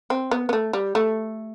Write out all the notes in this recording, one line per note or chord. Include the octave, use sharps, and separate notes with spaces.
C4
B3
B3
A3
G3
A3